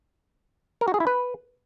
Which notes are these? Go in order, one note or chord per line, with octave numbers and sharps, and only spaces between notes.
A#4
F#4
G#4
E4
B4